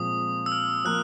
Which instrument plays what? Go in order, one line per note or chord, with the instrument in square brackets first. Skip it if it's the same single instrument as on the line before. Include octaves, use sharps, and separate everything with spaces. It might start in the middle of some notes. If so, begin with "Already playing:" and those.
Already playing: [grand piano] A#2 F3 G#3 C4 F4 [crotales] D#6
[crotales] E6
F6
[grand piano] F3 A#3 [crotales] F#6